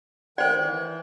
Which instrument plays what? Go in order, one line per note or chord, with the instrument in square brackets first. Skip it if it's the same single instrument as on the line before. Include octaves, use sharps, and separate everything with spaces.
[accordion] D#3 G5 F#6 [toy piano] C5 D5
[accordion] E3